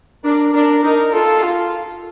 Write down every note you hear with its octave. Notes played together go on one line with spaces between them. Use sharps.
D4 A#4
D4 A#4
D#4 A#4
F4 A4
F4